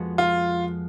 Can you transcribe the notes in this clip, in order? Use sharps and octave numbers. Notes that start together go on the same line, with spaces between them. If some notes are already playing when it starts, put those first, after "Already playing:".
Already playing: F2 F3 G#3 B3 F#4
F4